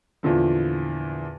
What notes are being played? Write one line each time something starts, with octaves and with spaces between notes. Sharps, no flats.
E2 A#2 D3 F3